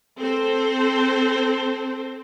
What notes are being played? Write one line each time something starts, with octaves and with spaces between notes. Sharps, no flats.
C4 A4 C5